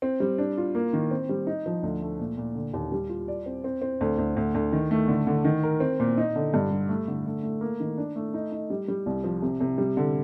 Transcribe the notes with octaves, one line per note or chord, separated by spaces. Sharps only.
C4
G3
D4
F4
A#3
D#3
C4
G3
D#4
F3
D2
A3
A#2
A#2
D3
D#2
G3
F4
D5
C4
C4
C4
D2
D2
D2
D2
D#3
A3
D3
D3
D#3
A#4
C4
A#2
D#4
D3
G2
G3
A3
D3
A3
A3
A#3
D#3
D4
A3
D#4
D#4
G3
G3
C2
F3
C3
C3
G3
D3